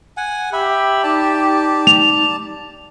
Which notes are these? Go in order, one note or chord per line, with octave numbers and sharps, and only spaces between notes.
F#5 G#5
G4 E5 B5
D#4 D5 A5
F7